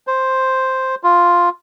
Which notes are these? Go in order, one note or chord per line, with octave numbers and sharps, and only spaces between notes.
C5
F4